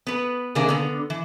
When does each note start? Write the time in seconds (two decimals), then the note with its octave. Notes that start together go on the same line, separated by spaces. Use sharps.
0.07 B3 B4
0.55 C3 D#3 A#3 D4 G#4
0.69 D3 B3
1.10 E3